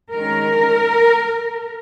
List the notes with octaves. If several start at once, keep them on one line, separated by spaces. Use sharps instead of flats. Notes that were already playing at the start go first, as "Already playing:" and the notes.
D#3 G#3 C#4 A#4